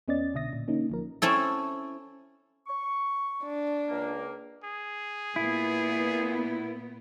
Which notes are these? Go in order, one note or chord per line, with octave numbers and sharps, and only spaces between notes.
E2 B3 C#4 D5 D#5 A6
C2 B2 D3 E5 D#6 A#6
A#2
D3 A#3 C#4 D#4
A1 F3 A#4
C4 C#4 E4 A4
C#6
D4
C#2 A#3
G#4
A#2 B3 E4